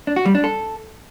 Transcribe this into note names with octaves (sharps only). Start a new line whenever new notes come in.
D4
F#4
G3
D4
A4